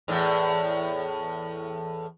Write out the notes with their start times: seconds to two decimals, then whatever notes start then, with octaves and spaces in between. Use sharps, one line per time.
0.08 E2 A2